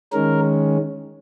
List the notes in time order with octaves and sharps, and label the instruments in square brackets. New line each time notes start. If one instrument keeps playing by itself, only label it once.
[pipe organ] D#3 G#3 C#4 A#4